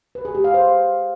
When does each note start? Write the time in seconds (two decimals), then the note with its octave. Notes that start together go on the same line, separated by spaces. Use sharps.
0.15 B4
0.25 G#4
0.35 G4
0.44 F5
0.54 C5